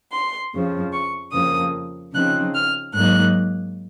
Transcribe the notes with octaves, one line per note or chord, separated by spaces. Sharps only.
C6
F2 C#3 F3
C#6
F2 C#3 F3 A#3 D#6
C#3 F3 C4 D#4 F#6
F6
G#2 F#3 A#3 D#4 F#6